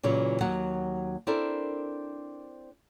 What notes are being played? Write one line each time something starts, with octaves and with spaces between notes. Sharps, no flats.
A#2 C#3 E3 F#3
D#2 F#3 F#5
C4 D4 E4 A4 A#4